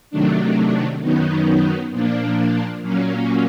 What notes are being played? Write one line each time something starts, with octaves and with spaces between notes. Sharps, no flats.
C3 D#3 F#3 A3 D4
F#2 D#3 F#3 B3 D#4
A#2 F3 A#3 D4
A#2 F#3 A#3 C#4